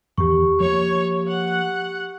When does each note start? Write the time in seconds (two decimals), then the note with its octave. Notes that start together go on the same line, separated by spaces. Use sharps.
0.18 E2 D#3 G4 C#6
0.60 F3 A#3 C#5
1.28 F#5